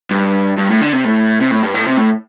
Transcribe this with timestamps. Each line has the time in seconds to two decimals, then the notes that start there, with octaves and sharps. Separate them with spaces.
0.11 G2
0.58 G2
0.70 A2
0.81 D3
0.93 C3
1.05 A2
1.41 C3
1.51 A2
1.63 G2
1.74 A2
1.86 C3
1.98 A2